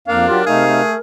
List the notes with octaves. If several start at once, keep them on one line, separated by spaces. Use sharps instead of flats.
F2 A#3 D4 A#4 F5
F#3 F4 G4
C3 A3 D#4 G#4 F5
A3